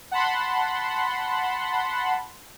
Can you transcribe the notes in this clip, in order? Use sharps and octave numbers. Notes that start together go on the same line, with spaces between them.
F#5 A5 B5 C6